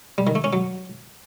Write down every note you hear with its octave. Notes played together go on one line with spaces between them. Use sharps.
G3
D#3
A3
C#4
F#3